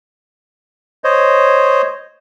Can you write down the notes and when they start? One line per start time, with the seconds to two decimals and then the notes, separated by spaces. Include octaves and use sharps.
1.04 C5 C#5 D#5